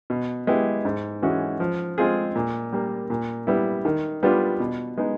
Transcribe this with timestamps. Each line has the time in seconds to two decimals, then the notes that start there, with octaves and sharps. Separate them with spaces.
0.10 B2
0.47 G#3 B3 E4 G4
0.85 G#2
1.22 E3 G#3 C#4 F#4
1.60 F3
1.98 G#3 C4 F4 G#4
2.35 A#2
2.72 G3 A#3
3.10 A#2
3.47 G3 B3 E4
3.85 D#3
4.23 G3 B3 D4 F4
4.60 B2
4.98 G#3 B3 D#4